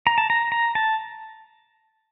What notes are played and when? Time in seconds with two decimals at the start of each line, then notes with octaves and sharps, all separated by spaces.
0.07 A#5
0.18 A5
0.30 A#5
0.52 A#5
0.75 A5